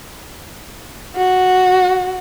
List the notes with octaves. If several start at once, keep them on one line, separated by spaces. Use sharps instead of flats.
F#4